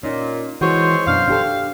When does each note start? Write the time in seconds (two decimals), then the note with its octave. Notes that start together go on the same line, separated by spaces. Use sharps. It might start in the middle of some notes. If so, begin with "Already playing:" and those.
0.03 A#2 C#4 D#4
0.61 E3 G#3 C4 F#4 C5 C#5
1.06 F#2 B2 D4 F5
1.28 D4 G4 A4